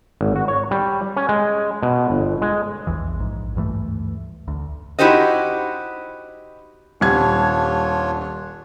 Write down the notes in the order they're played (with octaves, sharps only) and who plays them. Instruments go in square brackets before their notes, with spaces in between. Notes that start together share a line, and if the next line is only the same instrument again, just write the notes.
[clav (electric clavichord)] G#1
F#4
C#5
G3
C#4
G#3
B2
G1
G#3
[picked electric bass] A#1 E2 E3
A#1 G#2
D2 G2 E3 A3
D2
[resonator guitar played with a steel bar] D#4 E4 F#4 G4 C5 D#5
[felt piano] D#1 G3 G#6 [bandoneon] D4 F4 C#5